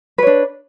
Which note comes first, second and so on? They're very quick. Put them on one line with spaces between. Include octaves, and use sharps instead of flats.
B4 C#5 D4